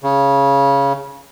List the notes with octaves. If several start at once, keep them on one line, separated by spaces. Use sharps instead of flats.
C#3